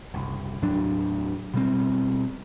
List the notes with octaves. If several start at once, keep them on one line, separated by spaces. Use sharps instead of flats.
F#1 C2
D#2 A2 F#3 D4
B2 G3 C4